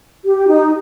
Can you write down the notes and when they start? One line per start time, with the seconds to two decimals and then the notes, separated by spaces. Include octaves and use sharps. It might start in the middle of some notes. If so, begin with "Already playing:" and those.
0.23 G4
0.48 D#4